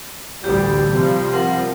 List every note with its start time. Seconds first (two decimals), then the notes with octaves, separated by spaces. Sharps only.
0.44 A1 D2 G3 G4
0.92 C3 F3 G3
1.33 C4 A#4 F#5